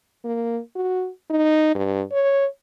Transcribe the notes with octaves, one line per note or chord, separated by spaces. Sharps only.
A#3
F#4
D#4
G2
C#5